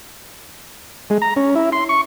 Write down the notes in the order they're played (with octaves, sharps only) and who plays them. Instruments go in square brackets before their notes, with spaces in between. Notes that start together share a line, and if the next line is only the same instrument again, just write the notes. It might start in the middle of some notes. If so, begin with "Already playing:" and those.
[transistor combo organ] G#3
A#5
C#4
E4
C6
C#6